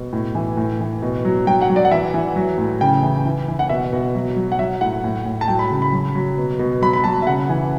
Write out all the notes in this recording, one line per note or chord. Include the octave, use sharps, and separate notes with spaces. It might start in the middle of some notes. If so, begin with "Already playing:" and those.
Already playing: B2
A2
E3
A2
E3
B2
F#3
F#3 G5
F#5
F#3
D5
F#5
E3 E5
E3
F#3
A2
C#3 G5
E3
E3
E3
F#5
B2 E5
B2
F#3
F#3
F#5
F#3 E5
A2 F#5
A2
A2
A5
F#3 G5
B5
C#3
B5
F#3
F#3
B2
B2
F#3 B5
B5
F#3 A5
E5
C#3 F#5
E3